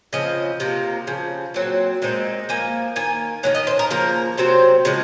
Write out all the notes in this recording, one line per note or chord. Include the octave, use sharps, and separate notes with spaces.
C#3 F3 C4 D#5
C3 F3 A#3
C#3 F3
A#2 F#3 C4
A#2 G#3 C4 D#4
F3 A#3 G#5
D#3 A#3 G#5
D#3 A#3 C#4 F#5
D#5
C5
A#4
C#3 F3 A#3 A#4
C3 F#3 C4 C5
C#3 F3 G#3